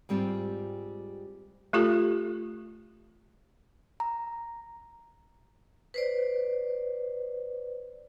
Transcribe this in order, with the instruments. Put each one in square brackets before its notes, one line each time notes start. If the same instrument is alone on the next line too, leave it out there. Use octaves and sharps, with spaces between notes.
[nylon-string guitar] G#2 G3 C4 F4
[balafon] A3 F4 G4 A4
[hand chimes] A#5
[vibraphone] B4 C5 D5